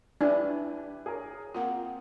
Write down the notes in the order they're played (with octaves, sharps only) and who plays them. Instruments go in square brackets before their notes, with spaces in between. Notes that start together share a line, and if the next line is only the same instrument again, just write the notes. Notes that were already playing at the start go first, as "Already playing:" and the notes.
[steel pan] D4 E4 [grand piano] G4 B4 G#5 [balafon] D5
[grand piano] G#4 A#4 C#5
[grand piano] A#3 C4 [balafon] F4 F#5